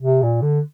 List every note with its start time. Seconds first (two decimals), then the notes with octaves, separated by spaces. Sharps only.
0.03 C3
0.23 A#2
0.42 D3